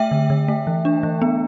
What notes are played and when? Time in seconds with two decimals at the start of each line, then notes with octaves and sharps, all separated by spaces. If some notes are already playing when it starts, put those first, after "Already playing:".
Already playing: A3 E5 G5
0.11 D3
0.30 D3
0.48 A3
0.67 E3
0.85 D4
1.03 E3
1.22 B3